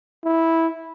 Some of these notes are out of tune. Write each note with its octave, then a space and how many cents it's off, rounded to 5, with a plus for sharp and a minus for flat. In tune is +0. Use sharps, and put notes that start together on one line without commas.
E4 -10